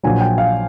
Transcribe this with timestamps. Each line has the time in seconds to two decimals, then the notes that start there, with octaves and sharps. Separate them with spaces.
0.03 A#1 A#2 F#3 G#5
0.21 G5
0.38 F5